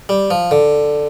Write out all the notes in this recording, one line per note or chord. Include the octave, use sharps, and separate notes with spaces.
G3
F3
D3